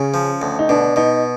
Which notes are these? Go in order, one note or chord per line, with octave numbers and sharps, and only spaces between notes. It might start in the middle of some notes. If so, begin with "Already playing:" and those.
Already playing: C#3 C#4
F3
D2
D#4
B2 D4
B2 D#4